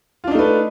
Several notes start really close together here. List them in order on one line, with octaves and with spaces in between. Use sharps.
F4 D4 D#4 A3 B4